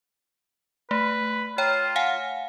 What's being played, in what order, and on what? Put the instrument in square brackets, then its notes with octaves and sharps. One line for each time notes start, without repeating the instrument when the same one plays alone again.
[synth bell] A3 [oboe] B4
[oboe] F4 [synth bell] C#5 G5 A#5
[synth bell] F5 F#5 G#5